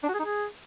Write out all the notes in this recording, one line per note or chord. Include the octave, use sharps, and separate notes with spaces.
D4
F#4
G#4
D#4
G#4